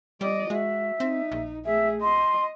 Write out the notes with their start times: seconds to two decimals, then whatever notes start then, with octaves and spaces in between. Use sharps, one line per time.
0.21 G3 D5 D#5
0.50 G#3 F#4 E5
1.00 C4 D#4
1.32 A#1
1.65 A3 G#4 E5
2.02 D#5 C6